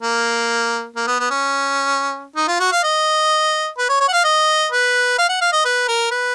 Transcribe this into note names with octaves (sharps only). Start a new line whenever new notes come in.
A#3
A#3
B3
B3
C#4
D#4
F4
F#4
F5
D#5
B4
C#5
C#5
F#5
F5
D#5
B4
F5
F#5
F5
D#5
B4
A#4
B4